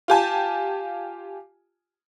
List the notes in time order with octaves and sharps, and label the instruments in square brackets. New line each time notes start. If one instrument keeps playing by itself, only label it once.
[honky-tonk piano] F4 G4 G#5 A5